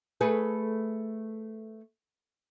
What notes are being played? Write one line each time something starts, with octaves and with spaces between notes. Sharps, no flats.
A3 G#4 B4